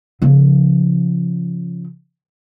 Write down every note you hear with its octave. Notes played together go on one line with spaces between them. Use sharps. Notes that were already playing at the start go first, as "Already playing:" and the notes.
C#3 F3